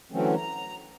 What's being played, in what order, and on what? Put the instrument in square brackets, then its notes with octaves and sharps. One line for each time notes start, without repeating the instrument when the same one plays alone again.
[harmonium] D3 E3 F#3 A3 C4 C#4
A#5